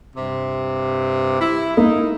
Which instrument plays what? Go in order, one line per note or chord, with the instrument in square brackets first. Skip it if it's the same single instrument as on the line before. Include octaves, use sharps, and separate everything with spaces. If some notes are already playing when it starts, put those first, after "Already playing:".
[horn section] G2 C3
E4
[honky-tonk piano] A#3 [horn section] D#4